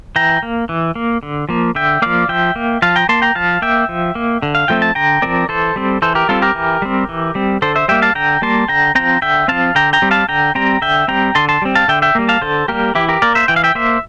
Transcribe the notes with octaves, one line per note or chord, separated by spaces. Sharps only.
E3 G5 A#5
A#3
E3
A#3
D3
F3 A#3
D3 E5 G5
F3 A#3 D5 F5
F3 E5 G5
A#3
F3 F5 A5
G5 A#5
A#3 A5 C6
G5 A#5
F3 F5 A5
A#3 E5 G5
F3
A#3
D3
F5
F3 A3 C4 G5
A5
D3 G5 A#5
F3 A3 C4 A#4 D5
E3 A4 C5
G3 C4
E3 A4 C5
G4 A#4
G3 C4 F4 A4
G4 A#4
E3
G3 C4
E3
G3 C4
D3 A4 C5
C5 E5
G3 A#3 E5 G5
F5 A5
D3 G5 A#5
G3 A#3 A5 C6
D3 G5 A#5
F3 C4 G5 A#5
D3 E5 G5
F3 C4 F5 A5
D3 G5 A#5
G5 A#5
G3 C4
F5 A5
D3 G5 A#5
G3 C4 G5 A#5
D3 E5 G5
G3 C4 G5 A#5
D3 A5 C6
A5 C6
G3 C4
F5 A5
D3 E5 G5
E5 G5
G3 A#3
F5 A5
D3 A4 C5
G3 A#3 G4 A#4
E3 E4 G4
G4 A#4
A#3 A#4 D5
C5 E5
E3 G5
F5
E5 G5
A#3 C5 E5